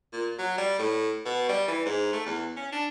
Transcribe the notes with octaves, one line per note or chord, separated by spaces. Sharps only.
A#2
F#3
G3
A2
B2
G3
E3
G#2
A3
E2
C#4
D4